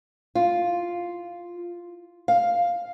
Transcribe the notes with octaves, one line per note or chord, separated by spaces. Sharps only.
F4
F5